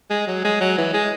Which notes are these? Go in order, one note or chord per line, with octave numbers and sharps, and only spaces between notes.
G#3
F#3
G#3
F#3
E3
G#3